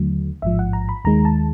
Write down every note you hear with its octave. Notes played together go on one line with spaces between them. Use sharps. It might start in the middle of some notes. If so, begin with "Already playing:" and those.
Already playing: D#2 D3 F#3 A3
A1 G#2 F3 E5
F#5
A#5
B5
D#2 D#3 G#3 A#5
A5